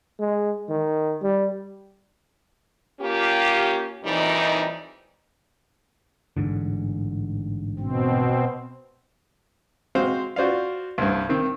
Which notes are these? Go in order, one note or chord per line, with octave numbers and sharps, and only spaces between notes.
G#3
D#3
G3
A#3 C#4 F4 G4
F2 A#2 E3 G3 D#4
A1 G#2 D3
B2 C4
G#3 C4 F#4 C5 F5
F4 F#4 C5 D5 F5
C2 G2
D#3 C4